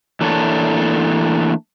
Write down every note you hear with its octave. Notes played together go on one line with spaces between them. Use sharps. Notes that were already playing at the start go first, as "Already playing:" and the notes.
E3 A3 A#3 D4 A4 C#5